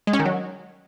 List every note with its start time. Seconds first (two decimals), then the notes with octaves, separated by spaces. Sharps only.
0.07 G#3
0.13 C#4
0.19 D#3
0.26 F#3